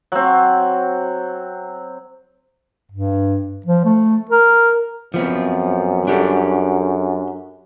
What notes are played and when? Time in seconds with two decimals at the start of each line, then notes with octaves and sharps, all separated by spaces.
0.12 F#3 C4
2.91 G2
3.66 F3
3.85 A3
4.31 A#4
5.14 F#2 F3 B3 C4
6.08 D4 G4 A4